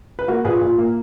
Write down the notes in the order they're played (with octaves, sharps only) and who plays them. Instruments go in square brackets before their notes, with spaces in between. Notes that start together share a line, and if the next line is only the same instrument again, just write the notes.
[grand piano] B4
A#3 F#4 A#4
A#2 G#4 B4
A#2
A#3